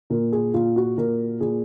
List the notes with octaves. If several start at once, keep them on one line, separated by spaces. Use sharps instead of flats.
A#2 A#4
G#4
A#2 F4
F#4
A#2 A#4
A#2 G#4